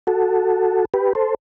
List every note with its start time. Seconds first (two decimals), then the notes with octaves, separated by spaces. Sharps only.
0.07 F#4 A4
0.94 G4 B4
1.15 A4 C5